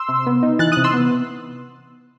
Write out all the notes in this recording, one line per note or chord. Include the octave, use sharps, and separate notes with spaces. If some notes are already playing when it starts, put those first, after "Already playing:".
Already playing: C6 E6
C3
B3
D#4
E3 F#6 A6
D#6 F#6
C3
C6 E6
B3